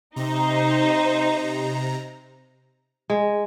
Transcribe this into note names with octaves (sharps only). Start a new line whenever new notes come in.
C3 D#4 C5 A#5
G#3